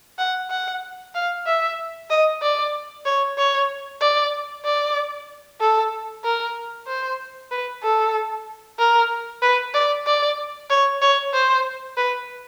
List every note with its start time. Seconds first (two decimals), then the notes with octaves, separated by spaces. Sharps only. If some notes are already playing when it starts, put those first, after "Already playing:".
0.19 F#5
0.50 F#5
1.15 F5
1.46 E5
2.10 D#5
2.42 D5
3.05 C#5
3.38 C#5
4.01 D5
4.65 D5
5.60 A4
6.24 A#4
6.87 C5
7.51 B4
7.83 A4
8.79 A#4
9.42 B4
9.74 D5
10.06 D5
10.70 C#5
11.02 C#5
11.34 C5
11.97 B4